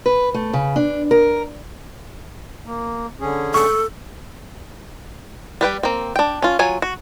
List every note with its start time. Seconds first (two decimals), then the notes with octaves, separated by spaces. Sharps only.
0.06 B4
0.34 A3
0.53 C#3
0.76 D4
1.11 A#4
2.65 A#3
3.20 D3 C#4 G#4
3.54 A4 C#6
5.61 G3 B4 G5
5.83 A#3 C4
6.16 D4 G5
6.42 C#4 F4
6.59 F#3 F4 G#5
6.82 F#4